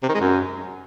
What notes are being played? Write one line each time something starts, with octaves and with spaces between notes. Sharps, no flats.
C3
D#3
G#3
F#2